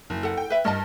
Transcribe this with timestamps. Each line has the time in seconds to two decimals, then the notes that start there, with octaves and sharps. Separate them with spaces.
0.10 F#1
0.23 A4 F#5
0.37 G5
0.50 B4 E5
0.65 G2 A#4 D#5 A5